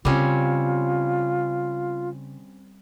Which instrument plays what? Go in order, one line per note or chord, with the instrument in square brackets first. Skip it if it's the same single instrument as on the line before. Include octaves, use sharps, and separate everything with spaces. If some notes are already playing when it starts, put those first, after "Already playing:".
[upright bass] C#3 [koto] G3 C4 C#4 [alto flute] F4